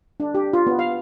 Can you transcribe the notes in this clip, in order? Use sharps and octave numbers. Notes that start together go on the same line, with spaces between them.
D4
G4
F4
B3
F5